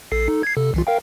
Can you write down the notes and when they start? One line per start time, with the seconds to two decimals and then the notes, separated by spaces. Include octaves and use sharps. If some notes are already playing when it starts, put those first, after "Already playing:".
0.12 A#1 A4 C7
0.28 D#4 A4
0.43 G#6 C7
0.57 C3 A4
0.74 C2 E3 F4
0.87 A#4 F5 G5